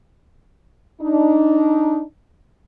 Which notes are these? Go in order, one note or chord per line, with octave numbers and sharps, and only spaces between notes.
D4 D#4